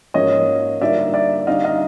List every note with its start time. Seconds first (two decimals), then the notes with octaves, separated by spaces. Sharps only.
0.14 G#2 F3 A#3 C#4 C#5 D#5
0.80 D3 G3 A#3 D#4 D5 E5
1.14 D5 E5
1.47 D3 G3 C4 D#4 D#5 F5
1.64 D#5 F5